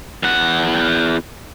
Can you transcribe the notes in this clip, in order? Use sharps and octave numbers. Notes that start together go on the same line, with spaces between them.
E2 F#5